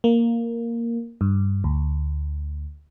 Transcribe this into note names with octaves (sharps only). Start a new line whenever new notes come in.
A#3
G2
D2